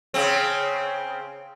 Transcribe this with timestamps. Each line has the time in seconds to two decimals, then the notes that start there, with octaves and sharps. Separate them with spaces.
0.14 C#3 C4